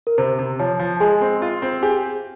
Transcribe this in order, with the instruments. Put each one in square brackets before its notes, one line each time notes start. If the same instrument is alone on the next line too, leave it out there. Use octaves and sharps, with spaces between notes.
[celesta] A#4
[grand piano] C3 [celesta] C5
[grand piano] C3
[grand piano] F3 [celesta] C#5
[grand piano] F3
[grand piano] G#3 [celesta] G#4 G#5
[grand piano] C4
F4
C4
[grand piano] G4 [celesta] G#4 G#5